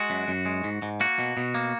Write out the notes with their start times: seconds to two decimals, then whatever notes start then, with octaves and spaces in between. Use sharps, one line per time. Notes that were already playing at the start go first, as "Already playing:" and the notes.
Already playing: G#3 F#4
0.10 F#2
0.28 F#2
0.46 G#3
0.64 G#2
0.82 G#2
1.00 A#3 F#4
1.19 B2
1.37 B2
1.54 A#3